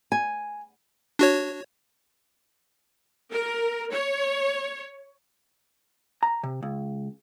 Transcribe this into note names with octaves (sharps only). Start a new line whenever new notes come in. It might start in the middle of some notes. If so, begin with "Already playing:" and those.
G#5
D4 F#4 C#5
A#4
C#5
A#5
C3
C#2